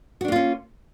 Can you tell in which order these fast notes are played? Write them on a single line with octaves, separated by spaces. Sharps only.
F#4 D4 A#3 F4 C#4